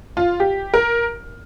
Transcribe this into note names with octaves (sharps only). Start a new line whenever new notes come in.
F4
G4
A#4